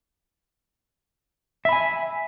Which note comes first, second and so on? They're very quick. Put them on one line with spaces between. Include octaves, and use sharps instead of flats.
E5 B5 G#5